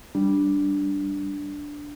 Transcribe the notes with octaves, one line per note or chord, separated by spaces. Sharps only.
G3 D4